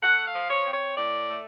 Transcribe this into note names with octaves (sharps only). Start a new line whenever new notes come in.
A3 F#5
F5
F3
C#5
C4
C#5
A2 D5
A3